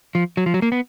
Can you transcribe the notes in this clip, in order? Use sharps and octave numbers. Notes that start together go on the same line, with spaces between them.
F3
F#3
F3
F#3
A#3
B3